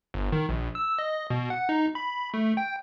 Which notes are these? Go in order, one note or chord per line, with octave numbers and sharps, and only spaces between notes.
G1
D#3
A#1
E6
D#5
B2
F#5
D#4
B5
A3
G5